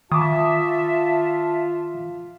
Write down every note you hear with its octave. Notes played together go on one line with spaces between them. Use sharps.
D#3 F4 E5 A5 D6 D#6